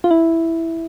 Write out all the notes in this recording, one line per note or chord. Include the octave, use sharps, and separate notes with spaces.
F4
E4